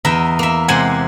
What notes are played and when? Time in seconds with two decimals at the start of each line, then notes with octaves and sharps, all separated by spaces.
0.05 E2 A#4 D#5 E5
0.39 A#3 E5
0.68 C3 G#3 C5 F#5 G#5